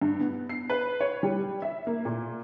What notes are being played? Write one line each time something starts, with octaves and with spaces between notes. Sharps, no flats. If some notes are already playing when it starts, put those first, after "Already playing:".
G2
B3
C7
B4
C#5
G3
E5
A#3
A#2